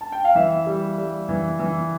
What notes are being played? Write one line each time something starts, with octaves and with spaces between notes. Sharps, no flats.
A5
G5
F5
E3 E5
G3
G3
E3
E3